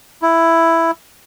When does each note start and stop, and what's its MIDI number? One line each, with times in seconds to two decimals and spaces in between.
0.22 0.91 64